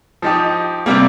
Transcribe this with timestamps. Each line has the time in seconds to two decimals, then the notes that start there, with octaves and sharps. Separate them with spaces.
0.22 F3 D#4 G4
0.86 C3 G3 A#3